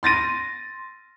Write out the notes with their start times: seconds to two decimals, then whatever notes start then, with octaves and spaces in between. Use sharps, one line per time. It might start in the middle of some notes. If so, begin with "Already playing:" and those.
0.03 C6 A6 A#6 D#7